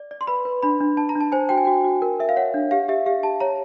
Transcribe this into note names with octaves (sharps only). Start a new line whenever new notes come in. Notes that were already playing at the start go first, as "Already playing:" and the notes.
Already playing: D5
D5
C6
B4 B5
B4
D4 B5
D4
D4 A5
A#5
D4
A5
C5 G#5
F#4 G5
G#5
F#4 G5
F#4
A#4
A#4 E5
F5
C#5 F#5
D4
G4 F5
G4 E5
G4 F5
G4 A5
C#5 A#5